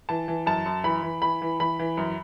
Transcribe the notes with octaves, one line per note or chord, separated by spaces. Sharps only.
E3 A5
E3
F#2 A5
F#2
E3 B5
E3
E3 B5
E3
E3 B5
E3
F#2